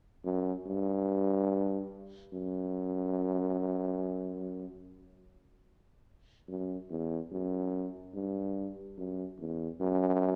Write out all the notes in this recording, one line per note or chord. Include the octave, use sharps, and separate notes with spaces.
F#2
G2
F#2
F#2
E2
F#2
G2
F#2
E2
F#2